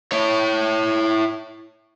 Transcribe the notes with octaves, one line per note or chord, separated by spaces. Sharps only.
E4 C#5